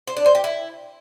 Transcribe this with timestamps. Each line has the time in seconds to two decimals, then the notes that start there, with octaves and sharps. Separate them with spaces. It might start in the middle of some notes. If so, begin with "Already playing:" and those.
0.07 C5
0.17 D4
0.26 C5
0.35 G4
0.44 E4